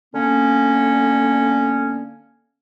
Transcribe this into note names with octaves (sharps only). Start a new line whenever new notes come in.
D3 A#3 B3 C#4